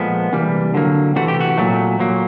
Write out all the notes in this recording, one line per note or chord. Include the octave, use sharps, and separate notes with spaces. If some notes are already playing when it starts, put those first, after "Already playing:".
Already playing: A#2 F3 G#3 B3 A4
C3 E3 G3 A#3
D3 F#3 A#3
C3 E3 A3 F#4
G4
F#4
A#2 F#3 A3
A#2 F#3 A#3